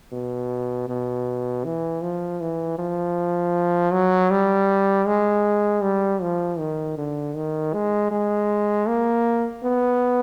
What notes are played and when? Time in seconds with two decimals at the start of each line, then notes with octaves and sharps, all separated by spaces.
0.12 B2
0.88 B2
1.65 E3
2.02 F3
2.41 E3
2.79 F3
3.93 F#3
4.31 G3
5.07 G#3
5.83 G3
6.22 F3
6.59 D#3
6.97 D3
7.36 D#3
7.73 G#3
8.11 G#3
8.88 A#3
9.64 B3